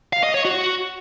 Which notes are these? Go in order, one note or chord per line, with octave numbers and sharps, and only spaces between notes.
F5
D#5
C#5
F#4